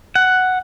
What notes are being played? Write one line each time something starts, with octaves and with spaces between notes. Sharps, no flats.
F#5